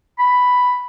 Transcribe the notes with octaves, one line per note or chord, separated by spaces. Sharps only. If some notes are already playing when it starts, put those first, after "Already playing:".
B5